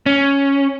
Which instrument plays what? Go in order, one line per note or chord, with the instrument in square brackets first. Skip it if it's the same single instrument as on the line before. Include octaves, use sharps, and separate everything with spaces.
[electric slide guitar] C#4